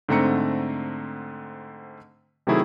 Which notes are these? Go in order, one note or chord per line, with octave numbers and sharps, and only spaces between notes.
G#2 D3 A3 C4 A#5 C#7
C3 D#3 F#3 A3 E4 G#4